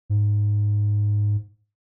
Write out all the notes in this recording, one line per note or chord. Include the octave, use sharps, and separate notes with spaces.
G#2